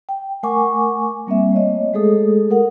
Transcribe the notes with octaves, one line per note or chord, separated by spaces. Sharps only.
G5
A3 A#4 F#5 G#5 C#6 D6
G3 A#3 C4 E5
A3 C#5 D#5
G#3 A3 G#4 A4 D#6
A#4 F#5